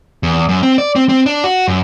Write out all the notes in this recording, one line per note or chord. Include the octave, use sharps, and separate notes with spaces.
E2
F#2
C4
D5
C4
C4
D4
F#4
F#2